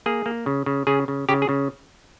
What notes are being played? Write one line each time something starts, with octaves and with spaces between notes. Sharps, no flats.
A#3 G#4
A#3
C#3
C#3
C#3 G#4
C#3
C#3 G4
G#4
C#3